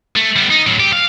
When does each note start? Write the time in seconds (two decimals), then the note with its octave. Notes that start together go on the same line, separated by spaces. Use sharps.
0.16 A3
0.36 G3 B3
0.50 D#4
0.67 A2 F#3
0.80 G4
0.93 F5